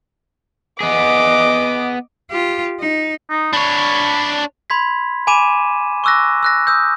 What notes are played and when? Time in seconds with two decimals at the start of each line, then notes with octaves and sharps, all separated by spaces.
0.80 B3 G#4 D#5 D6
2.31 F4 G4
2.80 D#4
3.30 D#4
3.53 D4 C#5 B5
4.70 B5 C6 G#6 B6
5.27 G#5 B5 D6 D#7 E7
6.04 C#6 D6 E6 F#6 A#6
6.43 E6 F#6 A#6
6.67 D#6 E6 G6